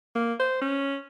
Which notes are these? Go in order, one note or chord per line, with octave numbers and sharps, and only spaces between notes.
A#3
C5
C#4